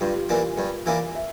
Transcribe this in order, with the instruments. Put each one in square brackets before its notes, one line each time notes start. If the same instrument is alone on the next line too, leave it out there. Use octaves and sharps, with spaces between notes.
[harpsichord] G2 [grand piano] F4
[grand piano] G4
[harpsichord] E3 A#3 D4
G2
E3 A#3 D4
[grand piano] E5